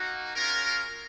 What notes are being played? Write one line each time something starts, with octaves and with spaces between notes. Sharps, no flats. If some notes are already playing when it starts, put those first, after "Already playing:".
Already playing: A#3 D#4 F#4
G#3 C#4 F4 A#4